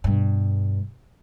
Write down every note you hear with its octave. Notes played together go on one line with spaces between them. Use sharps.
G2 B2